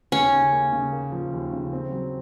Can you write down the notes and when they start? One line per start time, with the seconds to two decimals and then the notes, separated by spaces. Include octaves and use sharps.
0.12 D#2 C#4
0.33 C#3
0.52 A#3
0.72 C#3
0.92 A#3
1.12 F3
1.32 D#2
1.52 C#3
1.73 C4
1.92 F#3